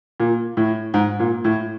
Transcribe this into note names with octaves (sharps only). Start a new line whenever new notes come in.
A#2
A2
G#2
A#2
A2